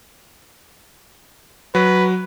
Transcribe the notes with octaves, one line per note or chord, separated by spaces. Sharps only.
F#3 B4